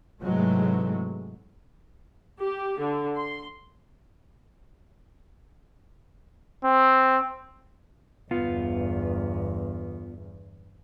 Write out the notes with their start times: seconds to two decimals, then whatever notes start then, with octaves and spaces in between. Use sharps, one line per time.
0.21 G#2 C3 E3 F#3 G#3 A3
2.38 G4
2.79 D3
3.16 C6
6.65 C4
8.31 G1 E2 B3 F4